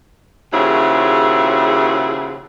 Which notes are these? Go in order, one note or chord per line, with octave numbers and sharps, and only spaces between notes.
D#2 C#3 F3 F#3 E4 G#4